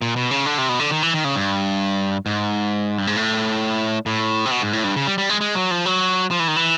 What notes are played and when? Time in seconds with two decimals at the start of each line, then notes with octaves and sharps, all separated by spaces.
0.02 A#2
0.16 B2
0.31 C#3
0.46 D3
0.58 C3
0.69 B2
0.80 D3
0.91 D#3
1.03 E3
1.14 D#3
1.25 C#3
1.36 G2
2.26 G#2
2.98 G2
3.07 G#2
3.16 A2
4.06 A2
4.46 C3
4.51 B2
4.62 G#2
4.73 A2
4.84 G2
4.96 C#3
5.07 G3
5.18 G3
5.29 G#3
5.41 G#3
5.55 F#3
5.71 F3
5.86 F#3
6.31 F3
6.40 E3
6.48 D#3
6.56 E3